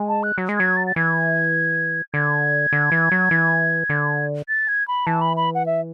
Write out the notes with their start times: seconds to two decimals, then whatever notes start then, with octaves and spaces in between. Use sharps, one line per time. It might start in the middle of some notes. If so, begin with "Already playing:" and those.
Already playing: G#3
0.09 A5
0.23 F#6
0.38 F#3
0.49 G#3
0.57 F#3 G#6
0.77 A6
0.87 A6
0.96 E3 G#6
2.14 D3 G#6
2.73 D3
2.92 E3
3.11 F#3
3.31 E3
3.90 D3
4.48 A6
4.68 G#6
4.88 B5
5.07 E3 A5
5.21 B5
5.37 B5
5.55 F#5
5.66 E5